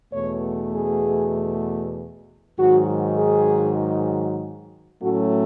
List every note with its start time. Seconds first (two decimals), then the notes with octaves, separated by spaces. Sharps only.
0.13 E2 B2 A3 C#5
0.74 G#4
2.58 G#2 D#3 F#3 F#4
3.18 G#4
5.02 A2 F#3 A3 C#4 F#4